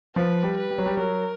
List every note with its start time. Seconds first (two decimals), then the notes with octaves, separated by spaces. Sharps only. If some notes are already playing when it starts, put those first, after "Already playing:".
0.15 F3 B4
0.43 G3
0.57 B4
0.70 G3
0.78 F#3
0.86 G3
0.97 F#3 A#4